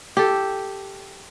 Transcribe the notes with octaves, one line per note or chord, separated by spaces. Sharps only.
G4 A4